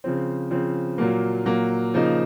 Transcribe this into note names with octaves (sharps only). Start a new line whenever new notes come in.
C#3 F3 C4
C#3 F3 C4
A#2 F#3 A#3
A#2 F#3 A#3
C#3 F3 A#3 D#4